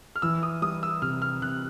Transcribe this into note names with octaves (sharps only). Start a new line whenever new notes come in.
F6
E3 E6
D#6
G3 D#6
E6
C3 F6
F6
C3 F#6